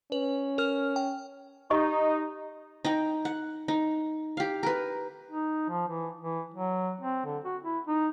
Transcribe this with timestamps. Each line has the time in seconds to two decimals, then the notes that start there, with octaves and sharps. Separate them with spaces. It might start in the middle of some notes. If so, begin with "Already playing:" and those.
0.12 C#4 B4
0.58 A#4 F6
0.96 G5
1.70 D#4 G4 D#5 C#6
2.85 D#4 D#5 G5
3.25 F#5
3.68 D#4
4.37 G4 F5
4.63 A#4 B4
5.31 D#4
5.69 F3
5.87 E3
6.21 E3
6.54 F#3
7.01 C4
7.25 D3
7.44 F#4
7.63 E4
7.87 D#4